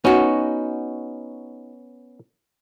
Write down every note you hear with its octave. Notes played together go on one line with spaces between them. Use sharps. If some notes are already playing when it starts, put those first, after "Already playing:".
B3 C#4 D#4 F#4